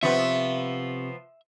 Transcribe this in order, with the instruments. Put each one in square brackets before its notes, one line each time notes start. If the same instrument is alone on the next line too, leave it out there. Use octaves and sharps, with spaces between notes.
[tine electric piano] C3 C#6 [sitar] F3 B3 [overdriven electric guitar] E5